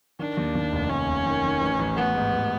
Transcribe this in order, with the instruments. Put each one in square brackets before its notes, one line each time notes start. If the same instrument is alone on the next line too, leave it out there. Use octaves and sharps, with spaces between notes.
[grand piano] D#3 [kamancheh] D4
[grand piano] D#2
D#2
F1
[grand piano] F1 [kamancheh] C#4
[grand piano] F1
D#3
D#3
A1
A1
[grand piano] A1 [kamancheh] B3
[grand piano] G#2
A1